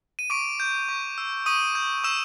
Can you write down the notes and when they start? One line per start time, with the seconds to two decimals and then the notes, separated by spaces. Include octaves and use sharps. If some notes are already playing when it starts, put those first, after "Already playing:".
0.19 D#7
0.30 C#6 D6 D7
0.60 G6
0.89 C#6
1.18 E6
1.46 C#6 D#6 D#7
1.75 G6
2.04 C#6 E6 E7